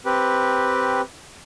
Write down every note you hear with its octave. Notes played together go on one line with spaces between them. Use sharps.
C4 G4 B4